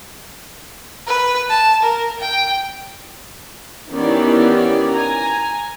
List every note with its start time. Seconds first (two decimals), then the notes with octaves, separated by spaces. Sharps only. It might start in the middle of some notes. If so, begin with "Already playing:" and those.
1.07 B4
1.50 A5
1.82 A#4
2.20 G5
3.90 D#3 E3 B3 C#4 G4 D5
4.91 G#5 A#5